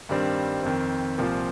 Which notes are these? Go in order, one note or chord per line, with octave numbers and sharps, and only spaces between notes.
G2 D#3 G3 C4
F2 D#3 C4
C2 A#2 F3 C4